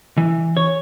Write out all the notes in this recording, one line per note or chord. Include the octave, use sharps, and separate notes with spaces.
E3
C#5